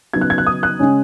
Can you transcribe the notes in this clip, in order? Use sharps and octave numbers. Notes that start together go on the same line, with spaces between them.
C#3 F#3 B3 D#4 G#6
F#6
G#6
F#6
D#6
F#6
C#3 G#3 C#4